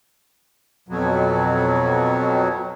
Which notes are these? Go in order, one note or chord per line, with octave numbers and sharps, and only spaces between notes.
F2 B2 F#3